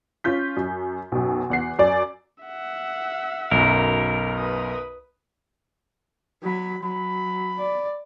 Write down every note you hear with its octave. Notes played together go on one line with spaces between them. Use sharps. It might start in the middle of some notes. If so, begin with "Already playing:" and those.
C#4 F4 G6 B6
F#2
B1 F#2
E2 F#5 C7
F#2 D5
E5 F#5
B1 F#2 A#4
B4 D#6
F#3 B5
F#3 B5
D5